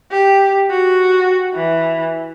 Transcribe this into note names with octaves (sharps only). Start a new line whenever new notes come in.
G4
F#4
E3